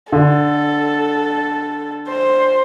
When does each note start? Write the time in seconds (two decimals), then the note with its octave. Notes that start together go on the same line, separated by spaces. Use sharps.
0.12 D3 A4
2.08 C5